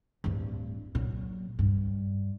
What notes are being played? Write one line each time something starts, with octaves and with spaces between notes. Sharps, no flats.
D1 G2
A#2 F#3
G2